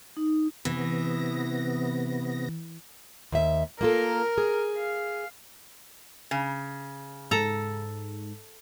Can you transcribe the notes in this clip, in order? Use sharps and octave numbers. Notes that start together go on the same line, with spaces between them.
D#4
C3 E3 B3 A#6
D#2 E5
A#3 F4 A4 A#4
G#4
F5
C#3
G#2 A4 A#5